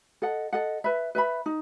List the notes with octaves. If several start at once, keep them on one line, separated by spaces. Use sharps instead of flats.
A4 D#5 F#5
A4 D#5 F#5
B4 E5 B5
B4 E5 B5
D#4